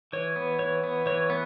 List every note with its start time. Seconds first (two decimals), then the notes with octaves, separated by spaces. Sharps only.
0.13 E3 C#5
0.36 B3
0.59 E3 C#5
0.83 B3
1.06 E3 C#5
1.30 B3